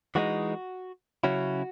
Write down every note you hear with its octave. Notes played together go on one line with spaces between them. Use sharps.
E3 G#3 B3 D#4 F#4
C#3 F#3 C#4 E4 F#4